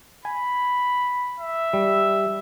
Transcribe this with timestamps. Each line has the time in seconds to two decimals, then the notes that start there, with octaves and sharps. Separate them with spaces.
0.25 G#5 B5
1.39 E5
1.73 G3